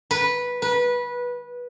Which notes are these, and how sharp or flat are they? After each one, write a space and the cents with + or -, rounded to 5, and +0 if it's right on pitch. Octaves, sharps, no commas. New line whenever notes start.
B4 -10
B4 -20